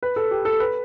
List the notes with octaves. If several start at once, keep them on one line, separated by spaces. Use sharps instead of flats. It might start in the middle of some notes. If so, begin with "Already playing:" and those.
B4
A4
G4
A4
B4